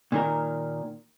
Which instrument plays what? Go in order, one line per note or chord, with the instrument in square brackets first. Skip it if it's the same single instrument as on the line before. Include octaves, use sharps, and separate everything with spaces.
[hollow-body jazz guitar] A#2 D#3 A#4